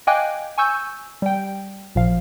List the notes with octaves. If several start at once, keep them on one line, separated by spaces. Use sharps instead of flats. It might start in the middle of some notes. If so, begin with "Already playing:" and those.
D#5 F5 G5 G#5 D6 F#6
G#5 C#6 E6 G6
G3 G5
A1 A#2 F3 F5